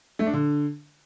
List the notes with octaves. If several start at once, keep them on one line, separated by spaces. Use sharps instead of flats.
A3
D4
D3